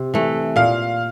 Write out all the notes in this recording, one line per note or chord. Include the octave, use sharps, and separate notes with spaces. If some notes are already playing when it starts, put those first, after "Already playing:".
Already playing: C3
E3 A3
A#2 F5